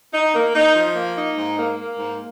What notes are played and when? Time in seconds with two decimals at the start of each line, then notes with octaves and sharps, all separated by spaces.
0.14 D#4
0.34 A#3
0.55 D#4
0.76 F3
0.95 A#3
1.16 D#4
1.37 G#2
1.57 A#3
1.79 A#3
1.99 G#2